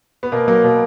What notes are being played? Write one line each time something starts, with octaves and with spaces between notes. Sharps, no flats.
B3
B2 A#3
F#3 A#3
B2